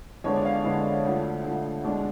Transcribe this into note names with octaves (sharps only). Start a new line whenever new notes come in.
F2 D3 G#3 B3 D4 C#5
D5
F5
F2 D3 G#3 B3 D4
D2 D3 F3
D2 D3 F3
B2 G#3 D4